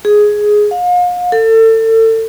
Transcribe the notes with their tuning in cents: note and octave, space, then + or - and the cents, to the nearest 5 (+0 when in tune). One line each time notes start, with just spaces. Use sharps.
G#4 +5
F5 +40
A4 +30